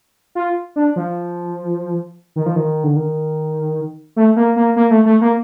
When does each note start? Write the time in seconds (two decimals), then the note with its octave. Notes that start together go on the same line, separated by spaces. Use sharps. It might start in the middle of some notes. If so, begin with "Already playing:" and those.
0.35 F4
0.76 D4
0.96 F3
2.36 D#3
2.46 F3
2.56 D#3
2.84 D3
2.96 D#3
4.16 A3
4.36 A#3
4.56 A#3
4.76 A#3
4.91 A3
5.06 A3
5.21 A#3